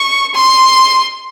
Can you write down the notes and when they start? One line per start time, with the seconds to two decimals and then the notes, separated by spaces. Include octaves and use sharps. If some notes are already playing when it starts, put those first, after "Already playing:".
Already playing: C#6
0.34 C6